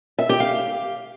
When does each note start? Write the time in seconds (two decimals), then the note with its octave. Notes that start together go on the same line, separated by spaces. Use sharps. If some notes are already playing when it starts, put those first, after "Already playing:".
0.19 E5
0.29 G4
0.40 F5